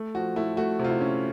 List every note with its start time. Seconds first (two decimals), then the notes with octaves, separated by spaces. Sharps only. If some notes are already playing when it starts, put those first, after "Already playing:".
Already playing: A3
0.15 F3 F#4
0.36 A3 E4
0.57 A3 F#4
0.79 C3
0.84 F4
0.90 E4
1.01 C#4